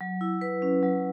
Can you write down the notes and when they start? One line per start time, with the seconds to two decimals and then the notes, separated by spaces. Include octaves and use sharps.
0.01 F#3
0.21 E4
0.41 B4
0.62 C#4
0.83 F#3